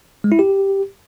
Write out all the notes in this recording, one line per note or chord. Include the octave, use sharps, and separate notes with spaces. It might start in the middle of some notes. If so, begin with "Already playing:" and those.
G#3
E4
G4